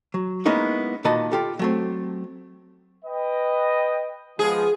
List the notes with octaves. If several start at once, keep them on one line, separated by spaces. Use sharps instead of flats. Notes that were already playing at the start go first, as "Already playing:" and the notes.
F#3
G#3 A#3 B3 C#4 D#4 E4
A#2 D#3 F#4 D#5 A5 B5
F4 G4 A4
F#3 A3 C4
B4 D#5 G5
F3 G#3 B3 G#4